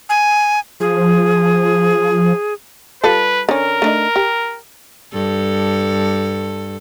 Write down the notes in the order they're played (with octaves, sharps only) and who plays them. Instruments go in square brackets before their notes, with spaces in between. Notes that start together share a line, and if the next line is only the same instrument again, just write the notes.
[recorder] G#5
[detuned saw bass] F3 [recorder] G#4
[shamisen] G3 F4 A4 [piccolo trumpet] B4
[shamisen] D3 C#4 [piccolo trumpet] A#4
[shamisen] A3 D4 D#4
G4
[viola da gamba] G2 A4